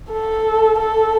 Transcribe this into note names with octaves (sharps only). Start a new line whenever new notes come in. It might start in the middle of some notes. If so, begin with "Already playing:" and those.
A4
A4